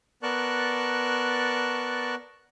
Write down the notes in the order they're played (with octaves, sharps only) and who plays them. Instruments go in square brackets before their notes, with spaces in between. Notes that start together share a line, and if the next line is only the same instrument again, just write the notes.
[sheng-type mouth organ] B3 A#4 D5 A5 C#6 F#6